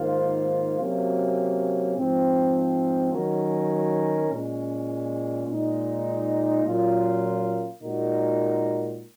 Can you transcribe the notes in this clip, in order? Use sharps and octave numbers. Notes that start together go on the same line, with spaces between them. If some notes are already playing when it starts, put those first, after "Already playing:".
Already playing: G#2 D#3 A#3 F4 C5
C3 F#3 A#3 C#4 F#4
G#2 F3 C4
D#3 F#3 C#4 F#4 A#4
A#2 G#3 C#4
A#2 G#3 D#4
A#2 F#3 C#4 F4 A#4
A#2 G#3 D#4 F#4 A#4